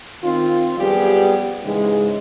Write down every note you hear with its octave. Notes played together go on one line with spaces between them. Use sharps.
D#3 C4 F4
F#2 F3 G3 B3 G4 G#4
G#2 C#3 E3 G#3